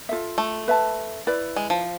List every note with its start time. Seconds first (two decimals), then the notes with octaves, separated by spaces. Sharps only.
0.09 F4 A4 E5
0.38 A3
0.68 B4 E5 A5
1.27 E4 B4 D5
1.56 G#3
1.70 F3